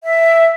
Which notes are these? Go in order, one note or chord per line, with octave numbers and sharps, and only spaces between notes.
E5